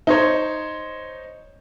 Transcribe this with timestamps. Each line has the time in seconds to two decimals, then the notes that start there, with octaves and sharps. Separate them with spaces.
0.07 D#4 C5 C#5